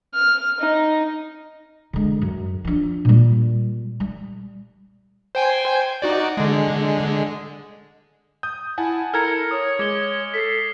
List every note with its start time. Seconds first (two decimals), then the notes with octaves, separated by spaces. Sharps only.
0.14 F6
0.60 D#4
1.93 D3 G#3
2.22 F#2
2.65 F3 D4
3.05 A#2 G3
4.00 G3
5.35 C5 G5 G#5
6.02 D#4 F#4 D5
6.37 D3 G#3
8.43 D#6 G6
8.78 E4 F#5 G#5 A5
9.14 E4 A4 A#4 A#5 F6 G#6 C#7
9.51 C#5 D#6
9.79 G#3 D6 G7
10.34 A4 B6 C7